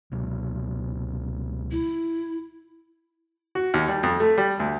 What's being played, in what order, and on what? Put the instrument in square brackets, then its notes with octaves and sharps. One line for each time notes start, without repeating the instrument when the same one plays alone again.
[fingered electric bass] C#2 B2 F#3
[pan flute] E4
[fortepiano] F#4
D#2
G3
F2
A3
G3
D2